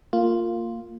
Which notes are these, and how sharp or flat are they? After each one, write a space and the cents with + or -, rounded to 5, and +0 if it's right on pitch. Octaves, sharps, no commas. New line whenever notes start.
A#3 -20 F4 +0